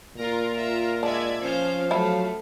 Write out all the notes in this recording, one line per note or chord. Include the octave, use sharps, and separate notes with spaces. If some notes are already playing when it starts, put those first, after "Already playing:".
A#2 F4 A#4 A#5
E5
G#3 D4 D5 E5 G#6
F3 C#4 C5 F5
F#3 A3 E4